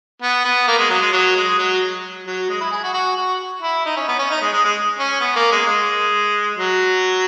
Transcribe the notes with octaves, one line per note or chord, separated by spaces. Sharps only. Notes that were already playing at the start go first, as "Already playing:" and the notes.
B3
B3
A#3
G#3
F#3
G#3
F#3
G#3
F#3
F#3
G#3
E4
G#4
F#4
F#4
F#4
E4
D#4
C#4
B3
C#4
D#4
G#3
G#3
G#3
C#4
B3
A#3
G#3
G#3
F#3